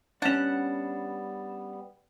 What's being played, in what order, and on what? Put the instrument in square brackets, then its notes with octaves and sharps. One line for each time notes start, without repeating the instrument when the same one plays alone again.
[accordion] G3 B3 [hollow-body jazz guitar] C#4 D4 [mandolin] F#5 [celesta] A6 E7